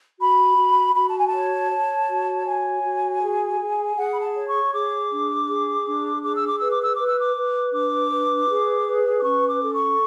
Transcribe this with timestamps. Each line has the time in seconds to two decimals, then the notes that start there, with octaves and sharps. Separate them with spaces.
0.20 F#4 B5
0.58 F#4
0.95 F#4 B5
1.07 A5
1.18 G#5
1.28 A5
1.33 C#5
1.70 C#5
2.09 F#4
2.46 C#5 G#5
2.83 F#4
3.21 G#4
3.60 G#4
3.96 G#4 F#5
4.13 B5
4.21 A5
4.35 C#5
4.47 C#6
4.72 G#4 D6
5.10 D4
5.48 G#4
5.85 D4
6.22 G#4 D6
6.35 E6
6.46 D6
6.58 B4 E6
6.72 D6
6.83 E6
6.95 B4 D6
7.08 E6
7.19 D6
7.36 B4
7.73 D4 D6
8.11 B4
8.49 G#4
8.87 B4
9.19 D6
9.24 C#4 C#6
9.49 D6
9.62 A4
9.74 C#6